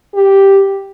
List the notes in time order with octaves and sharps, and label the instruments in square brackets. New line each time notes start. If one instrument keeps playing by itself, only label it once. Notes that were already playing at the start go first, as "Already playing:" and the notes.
[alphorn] G4